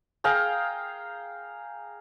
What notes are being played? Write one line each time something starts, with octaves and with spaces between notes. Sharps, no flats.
G#4 F5 G5 A#5